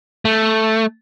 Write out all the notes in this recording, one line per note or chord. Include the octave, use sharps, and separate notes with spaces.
A3